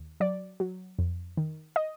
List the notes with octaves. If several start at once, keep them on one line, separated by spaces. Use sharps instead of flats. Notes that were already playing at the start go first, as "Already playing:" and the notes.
Already playing: D#2
F#3 D5
F#3
F2
D#3
D#5